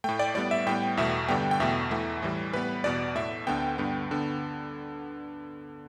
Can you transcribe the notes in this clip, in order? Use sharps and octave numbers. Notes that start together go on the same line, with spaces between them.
A2 A3 G5
D5
A2 G3 B3 D5
E5
A2 G3 B3 G5
E2 B2 A3 E5
G2 D3 G3 B3 G5
G5
E2 B2 A3 E5
E2 E3 A3
A2 E3 G3
A2 G3 B3 B4
E2 B2 B3 D5
A2 A3 E5
D2 D3 B3 G5
G2 D3 B3
D3 B3